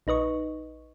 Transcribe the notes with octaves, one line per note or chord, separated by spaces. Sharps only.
A#1 D#4 B4 D#5 C#6